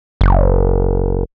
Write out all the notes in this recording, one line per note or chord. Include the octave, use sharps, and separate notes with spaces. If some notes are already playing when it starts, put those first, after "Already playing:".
F#1